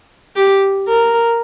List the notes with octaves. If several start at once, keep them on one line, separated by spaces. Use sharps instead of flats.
G4
A#4